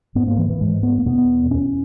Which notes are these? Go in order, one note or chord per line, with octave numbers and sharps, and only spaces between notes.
G#2 B3
A#3
E3
E3
G#2 G#3
B3
A#3
E2 B2 B3
E2 B2 C#4